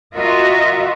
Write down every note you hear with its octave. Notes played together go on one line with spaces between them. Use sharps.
F4 F#4 A#4 D#5 E5